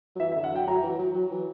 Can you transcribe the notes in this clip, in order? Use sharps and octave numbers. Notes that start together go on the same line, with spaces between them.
F#3
E3 E5
E5
D3
F#5
F#3 G5
F#3 A#5
E3
F#3
F#3
E3